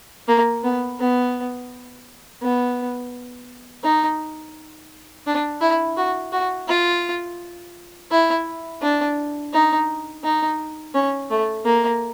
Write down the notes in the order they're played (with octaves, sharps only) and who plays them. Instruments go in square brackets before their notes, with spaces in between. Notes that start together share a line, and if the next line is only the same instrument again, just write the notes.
[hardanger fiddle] A#3
B3
B3
B3
D#4
D4
E4
F#4
F#4
F4
E4
D4
D#4
D#4
C#4
A3
A#3